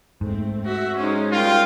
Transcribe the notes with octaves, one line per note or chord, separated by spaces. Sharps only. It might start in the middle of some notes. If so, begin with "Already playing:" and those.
G#2 A3 C4
F#4 E5
G#3 C#4 D#4 C5
G3 F4 A#4 G5